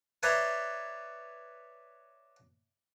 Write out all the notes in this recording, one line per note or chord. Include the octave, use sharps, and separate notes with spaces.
B4 C#5 D5 E5 A#5 C6